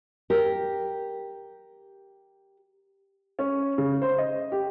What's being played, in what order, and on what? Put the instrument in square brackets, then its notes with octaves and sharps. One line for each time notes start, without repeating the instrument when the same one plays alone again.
[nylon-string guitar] G4 A#4
[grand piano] C#4
C#3
C5
D#5
G4